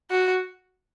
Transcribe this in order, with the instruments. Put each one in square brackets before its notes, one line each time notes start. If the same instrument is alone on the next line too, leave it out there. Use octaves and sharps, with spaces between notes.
[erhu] F#4